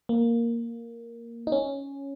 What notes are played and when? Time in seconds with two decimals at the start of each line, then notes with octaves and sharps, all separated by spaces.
0.09 A#3
1.47 D#4
1.52 C#4